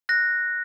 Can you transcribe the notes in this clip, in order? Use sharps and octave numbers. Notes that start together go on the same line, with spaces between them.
F#6 A#6